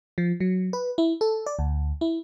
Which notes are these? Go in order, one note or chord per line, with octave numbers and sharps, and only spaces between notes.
F3
F#3
B4
E4
A4
D5
D2
E4